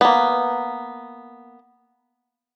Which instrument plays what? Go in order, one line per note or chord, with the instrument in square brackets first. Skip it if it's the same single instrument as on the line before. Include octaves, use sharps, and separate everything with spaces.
[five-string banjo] A#3 B3